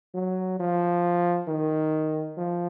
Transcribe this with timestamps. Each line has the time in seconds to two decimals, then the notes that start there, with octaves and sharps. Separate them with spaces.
0.15 F#3
0.60 F3
1.48 D#3
2.37 F3